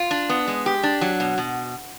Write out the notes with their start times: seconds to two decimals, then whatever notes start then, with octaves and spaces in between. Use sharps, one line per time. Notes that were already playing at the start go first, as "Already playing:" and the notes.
Already playing: F4
0.11 D4
0.29 B3
0.47 G#3
0.66 G4
0.83 D4
1.01 F#3
1.20 B2
1.38 B2